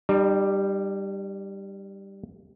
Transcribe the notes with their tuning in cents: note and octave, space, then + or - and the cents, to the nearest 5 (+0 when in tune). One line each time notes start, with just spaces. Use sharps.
G3 +0 D#4 -45